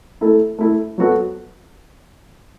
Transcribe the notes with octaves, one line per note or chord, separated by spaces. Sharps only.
A3 E4 A4
A3 E4 A4
F#3 B3 F#4 A4